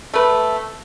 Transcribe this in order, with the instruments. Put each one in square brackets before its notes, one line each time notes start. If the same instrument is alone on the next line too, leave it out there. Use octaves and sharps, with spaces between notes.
[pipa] A3 B4